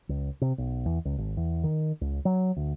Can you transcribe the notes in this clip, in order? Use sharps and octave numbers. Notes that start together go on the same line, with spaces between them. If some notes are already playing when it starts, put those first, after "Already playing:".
C#2
C3
B1
E2
C#2
G#1
E2
D#3
C#2
F#3
D2